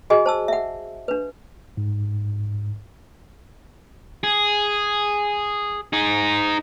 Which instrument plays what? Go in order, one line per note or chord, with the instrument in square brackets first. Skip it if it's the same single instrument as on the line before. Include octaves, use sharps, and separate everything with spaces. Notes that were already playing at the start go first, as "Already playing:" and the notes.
[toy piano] F#4 G#4 D#5 G#5
C5 A5 E6
E5 F#5
D4 B4
[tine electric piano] G#2
[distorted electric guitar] G#4
D#4 G#4